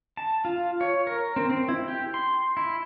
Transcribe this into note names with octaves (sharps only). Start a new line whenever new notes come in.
A5
F4
C#5
A#4
C4
C4
E4
G4
C6
E4